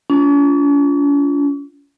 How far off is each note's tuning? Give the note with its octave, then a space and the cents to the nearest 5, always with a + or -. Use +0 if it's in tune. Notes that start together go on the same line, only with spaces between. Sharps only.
C#4 +45 F4 -15